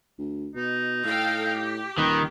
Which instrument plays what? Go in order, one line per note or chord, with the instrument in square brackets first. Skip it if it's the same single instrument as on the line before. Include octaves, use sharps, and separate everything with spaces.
[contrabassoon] D2
[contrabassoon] B2 [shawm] D#4
[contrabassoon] A2 [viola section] A4 F5 G5
[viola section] G4
[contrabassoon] D#1 [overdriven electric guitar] D#3 [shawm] B4